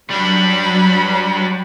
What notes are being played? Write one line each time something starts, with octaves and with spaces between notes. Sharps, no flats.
F#3 G3 D4 B5